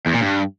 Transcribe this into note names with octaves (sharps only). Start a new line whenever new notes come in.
E2
A#2
G2